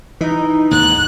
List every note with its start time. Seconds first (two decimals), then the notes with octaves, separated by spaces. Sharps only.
0.21 E3 D#4
0.71 D#2 G#2 F#6